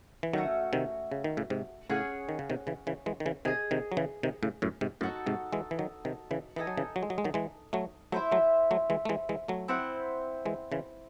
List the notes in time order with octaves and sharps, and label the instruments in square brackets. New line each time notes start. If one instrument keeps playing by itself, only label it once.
[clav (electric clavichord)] E3
[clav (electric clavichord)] D#3 F#3 [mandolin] A3 C#4 F#4
[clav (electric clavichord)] C3 D#3
C#3
D#3
A2 C#3
G#2 C3
[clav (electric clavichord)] A2 C#3 [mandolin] C#4 G#4 C#5 F#5
[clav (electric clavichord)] D#3
C#3
C3 D#3
C#3 E3
C#3 E3
E3 G#3
D#3
C#3 E3
[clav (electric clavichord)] C3 D#3 [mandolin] G#4 D#5 G#5
[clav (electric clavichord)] C3 D#3
F#3
C#3 E3
C3 D#3
A2 C#3
F#2 A2
G#2 C3
[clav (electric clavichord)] F#2 A2 [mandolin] D#4 F#4 A4
[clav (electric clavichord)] G#2 C3
E3 G#3
E3
D#3 F#3
C3 D#3
C#3 E3
[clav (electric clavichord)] E3 [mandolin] D#4 A4 D#5 G#5
[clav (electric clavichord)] F#3
C#3 E3
F#3
G#3
F#3
G#3
D#3 F#3
E3 G#3
F#3 A3
[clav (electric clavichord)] F#3 A3 [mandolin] E4 C5 E5
[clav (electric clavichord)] F#3 A3
F#3 A3
E3 G#3
A3
E3 G#3
E3 G#3
F#3 A3
[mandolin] C4 E4 C5 F#5
[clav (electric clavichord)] E3 G#3
C#3 E3